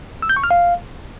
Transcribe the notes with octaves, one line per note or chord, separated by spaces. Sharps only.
E6
G6
C#6
F6
F5